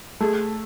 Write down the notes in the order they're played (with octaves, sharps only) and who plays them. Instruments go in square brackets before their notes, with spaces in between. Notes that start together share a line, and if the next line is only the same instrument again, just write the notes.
[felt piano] A3 [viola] G#4